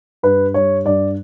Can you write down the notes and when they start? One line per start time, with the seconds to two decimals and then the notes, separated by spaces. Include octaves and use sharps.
0.23 G2 B4
0.54 G3 C#5
0.85 G2 D5